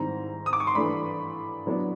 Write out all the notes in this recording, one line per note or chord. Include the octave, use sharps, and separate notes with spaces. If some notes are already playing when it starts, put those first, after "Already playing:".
Already playing: G#2 D#3 G3 C4 E4 A#5
D#6
D6
C#6
C6
G2 E3 A3 D4 B5
A2 F#3 B3 D4